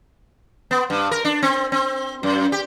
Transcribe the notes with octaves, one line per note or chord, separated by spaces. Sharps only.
B3
G2
A#4
D4
C4
C4
F#2
G4